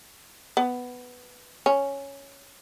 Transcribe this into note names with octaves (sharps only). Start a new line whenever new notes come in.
B3
C#4